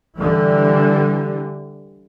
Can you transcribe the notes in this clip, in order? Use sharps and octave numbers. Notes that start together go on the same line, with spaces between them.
D3 E3 G3